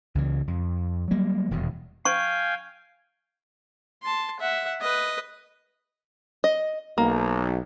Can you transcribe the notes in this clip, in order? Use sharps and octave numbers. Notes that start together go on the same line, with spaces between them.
C#2 C#3 E3
F2
F#3 G3 A#3
D#1 E2 B2
F5 G5 G#5 C#6
A5 C6
E5 F#5
B4 D#5
D#5
B1 A#3